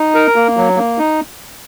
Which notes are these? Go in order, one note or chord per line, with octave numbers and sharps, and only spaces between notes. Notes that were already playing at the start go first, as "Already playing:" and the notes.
Already playing: D#4
A#4
A#3
F#3
A#3
D#4